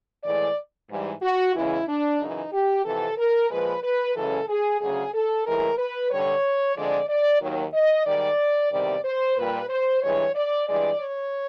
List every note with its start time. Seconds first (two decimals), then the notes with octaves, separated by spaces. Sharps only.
0.24 A2 E3 G#3 D5
0.90 G#2 E3 G3
1.23 F#4
1.55 E2 C#3 E3 G#3 E4
1.88 D4
2.20 F#2 C#3 E3 D#4
2.53 G4
2.85 F2 C3 E3 A4
3.18 A#4
3.51 A#2 F3 G#3 B4
3.84 B4
4.16 F#2 C#3 E3 G#3 A4
4.49 G#4
4.81 D2 C#3 F#3 G#4
5.14 A4
5.46 A2 E3 G#3 A#4
5.79 B4
6.11 G2 D3 G3 C#5
6.76 F2 D3 F3 G#3 D5
7.09 D5
7.42 D#2 D#3 F#3
7.74 D#5
8.06 G#2 D#3 G3 D5
8.72 E2 C3 D#3 G3 D5
9.05 C5
9.37 A#2 G3 B4
9.70 C5
10.02 G2 E3 G#3 C#5
10.35 D5
10.68 G2 E3 G#3 D5
11.00 C#5